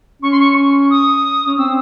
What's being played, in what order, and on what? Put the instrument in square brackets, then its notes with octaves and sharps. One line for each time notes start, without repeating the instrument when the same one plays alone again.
[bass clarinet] C#4 [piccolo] C#6
[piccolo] C6
C#6
D#6
[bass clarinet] C#4
[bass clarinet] C4 [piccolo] E6